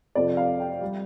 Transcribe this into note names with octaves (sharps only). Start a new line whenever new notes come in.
F2 C3 F3 D5
F5
G5
G3